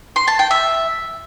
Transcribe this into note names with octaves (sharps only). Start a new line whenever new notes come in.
C6
A5
G5
E5